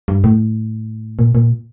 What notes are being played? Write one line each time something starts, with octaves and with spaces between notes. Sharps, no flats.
G2
A2
A#2
A#2